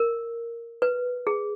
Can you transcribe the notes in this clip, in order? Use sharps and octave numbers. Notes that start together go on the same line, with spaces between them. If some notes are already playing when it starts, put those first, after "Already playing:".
Already playing: A#4
B4
G#4